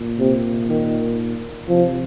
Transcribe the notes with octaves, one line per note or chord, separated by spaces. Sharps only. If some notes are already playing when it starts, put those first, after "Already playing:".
Already playing: A#2
C3
D#3
C3 F3